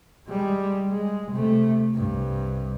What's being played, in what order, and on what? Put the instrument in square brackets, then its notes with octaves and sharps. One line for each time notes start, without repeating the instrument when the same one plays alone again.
[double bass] G3 G#3
G#3
C3 A3
C2 G2